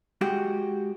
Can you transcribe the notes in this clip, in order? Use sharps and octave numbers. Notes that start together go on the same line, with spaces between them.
G#3 F#4 G4